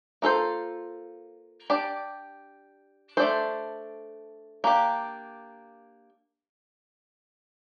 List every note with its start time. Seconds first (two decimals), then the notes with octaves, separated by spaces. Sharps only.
0.22 A#3 F4 A4 C5
1.70 D4 G4 D5
3.17 A3 D4 A4 C5
4.64 A#3 D4 G4